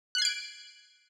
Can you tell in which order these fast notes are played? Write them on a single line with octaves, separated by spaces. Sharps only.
F#6 C7 G#6 D7